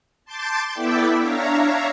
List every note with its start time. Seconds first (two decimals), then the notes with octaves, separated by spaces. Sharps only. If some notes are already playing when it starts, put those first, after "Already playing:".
0.25 A5 C6 D6 G6 A6
0.72 B3 E4 A4 D5 E5 G5
1.19 D4 C#5 E5 F5 A#5